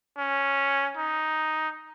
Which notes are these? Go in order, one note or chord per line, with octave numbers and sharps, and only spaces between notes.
C#4
D#4